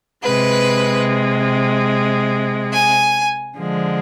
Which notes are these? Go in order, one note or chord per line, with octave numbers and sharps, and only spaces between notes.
C3 G#3 B4
G#5
D3 F3 G#3